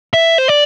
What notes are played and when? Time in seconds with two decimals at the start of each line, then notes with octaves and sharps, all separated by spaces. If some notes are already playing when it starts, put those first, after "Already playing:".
0.14 E5
0.38 C5
0.48 D5